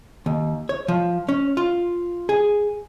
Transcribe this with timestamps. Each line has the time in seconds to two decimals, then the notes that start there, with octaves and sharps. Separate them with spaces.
0.26 D#2
0.69 C#5
0.88 F3
1.29 C#4
1.57 F4
2.29 G#4